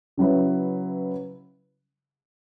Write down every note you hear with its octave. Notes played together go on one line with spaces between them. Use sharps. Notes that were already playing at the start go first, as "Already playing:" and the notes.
C#3 F#3 C#4 E4 B4